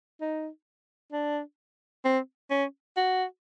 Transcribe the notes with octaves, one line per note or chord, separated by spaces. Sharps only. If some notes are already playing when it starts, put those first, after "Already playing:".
D#4
D4
C4
C#4
F#4